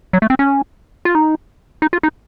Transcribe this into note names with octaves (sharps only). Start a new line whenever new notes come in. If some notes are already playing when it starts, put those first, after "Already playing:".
F#3
A3
C4
C#4
F4
D#4
D#4
F4
D#4